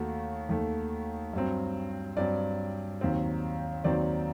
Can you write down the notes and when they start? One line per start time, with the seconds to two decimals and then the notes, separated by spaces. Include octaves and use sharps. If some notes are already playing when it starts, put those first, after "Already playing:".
Already playing: D#2 D#3 A3 F#4
0.49 D#2 D#3 A3
1.33 G2 F#3 C4
2.17 G2 F#3 C4 D5
3.01 D#2 D#3 F#3 C4
3.84 D#2 D#3 F#3 C4 D5